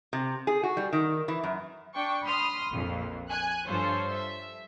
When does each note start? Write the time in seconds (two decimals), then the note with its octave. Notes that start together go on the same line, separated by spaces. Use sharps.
0.13 C3
0.47 G#4
0.63 F#4
0.77 G3
0.93 D#3
1.28 E3
1.43 F#2
1.94 D4 G5 C#6
2.25 B5 C6 D#6 F6
2.70 A#1 F2
3.29 G#5 F#6
3.67 G2 F3 F4 A4 C5 C#5
4.13 E5